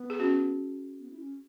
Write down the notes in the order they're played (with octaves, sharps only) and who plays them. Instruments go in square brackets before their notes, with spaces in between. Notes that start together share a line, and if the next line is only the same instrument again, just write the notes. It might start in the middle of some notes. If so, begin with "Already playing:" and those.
Already playing: [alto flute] B3
[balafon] G#4
C#4 F#4
[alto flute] B3
E4
C#4